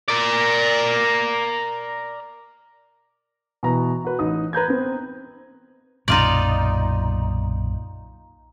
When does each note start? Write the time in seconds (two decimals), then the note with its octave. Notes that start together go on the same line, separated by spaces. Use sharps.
0.08 A#4 D5
3.63 B2 E3 A#5
4.04 F#4 B4
4.19 A1 D#4 D#6
4.53 B4 A#5 G6 G#6
4.68 B3 C4
6.08 B1 F#2 A#2 D#4 F4 D5